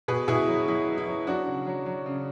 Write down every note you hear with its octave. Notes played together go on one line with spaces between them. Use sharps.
B2 G#4 B4
B2 E4 G#4
F#3
F#3 E4
F#3
E4
F#3
F#3 D4 F#4
C#3
F#3
F#3
C#3